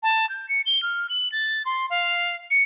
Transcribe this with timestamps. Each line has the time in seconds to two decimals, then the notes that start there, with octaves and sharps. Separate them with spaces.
0.03 A5
0.29 G6
0.49 C#7
0.66 G7
0.83 F6
1.10 F#7
1.32 A6
1.66 C6
1.90 F5
2.51 C#7